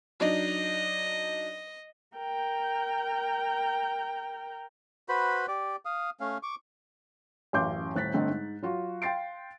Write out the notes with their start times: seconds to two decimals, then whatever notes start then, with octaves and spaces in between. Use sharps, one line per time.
0.20 F#3 D4 D#4 D#5
2.17 A#4 G5
5.09 F#4 B4 C5 B5
5.48 G4 D5
5.85 F5 D#6
6.20 A3 C#4 F5
6.43 C#6 D6
7.53 A1 F#2 F5 C6 D6 G6
7.95 D#1 A2 F#6 A6 B6
8.14 G1 D3 A3 C4 D#5
8.29 G#2
8.62 F#3 F4 F#4
9.02 F5 G5 C6 A6 C7 D7